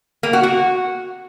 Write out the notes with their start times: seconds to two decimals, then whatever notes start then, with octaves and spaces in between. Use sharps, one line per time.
0.23 A#3
0.33 F#4
0.43 F#4